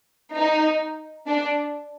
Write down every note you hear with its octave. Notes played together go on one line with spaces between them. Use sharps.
D#4
D4